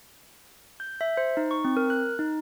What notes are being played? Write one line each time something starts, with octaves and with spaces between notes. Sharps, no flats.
G6
E5
C5
D#4
C#6
C4
A#4
F#6
D#4